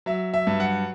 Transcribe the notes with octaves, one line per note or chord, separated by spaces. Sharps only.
F#3 E5
E5
G2
F#5